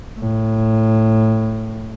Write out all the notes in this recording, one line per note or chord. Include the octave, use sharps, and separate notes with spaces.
A2